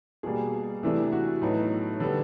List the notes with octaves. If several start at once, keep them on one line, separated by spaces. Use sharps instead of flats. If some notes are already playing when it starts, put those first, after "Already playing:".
B2 G3 A#3 G#4
C3 E3 A3 D4
F#4
A2 F#3 B3 D#4
D3 G3 B3